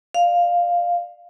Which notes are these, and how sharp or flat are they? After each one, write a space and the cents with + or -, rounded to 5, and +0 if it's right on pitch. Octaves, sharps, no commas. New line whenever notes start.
D5 +25 F5 +0